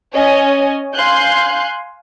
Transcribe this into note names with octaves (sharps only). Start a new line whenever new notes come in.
C#4 C#5 D#5 G#5
F5 G#5 C6 F#6 G6